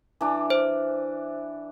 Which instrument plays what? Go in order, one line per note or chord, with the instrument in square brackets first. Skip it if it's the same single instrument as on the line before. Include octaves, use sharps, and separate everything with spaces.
[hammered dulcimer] E3 D4 D5
[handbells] C5